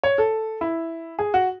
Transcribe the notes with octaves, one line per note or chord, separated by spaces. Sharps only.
C#5
A4
E4
G#4
F#4